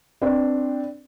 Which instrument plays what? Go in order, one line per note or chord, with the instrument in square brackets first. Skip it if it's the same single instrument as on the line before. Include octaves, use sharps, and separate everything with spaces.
[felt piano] C4 D4 B4